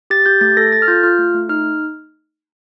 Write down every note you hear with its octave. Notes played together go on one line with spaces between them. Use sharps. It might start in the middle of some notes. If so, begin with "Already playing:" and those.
G4 A6
G4 G6
A3 A6
A4 A#6
A4 A6
F6
F4 G6
F4 F6
A3
A3
D#4 F6